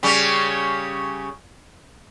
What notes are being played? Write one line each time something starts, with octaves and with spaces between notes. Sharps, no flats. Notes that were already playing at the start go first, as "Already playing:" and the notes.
C#3 G3 C#4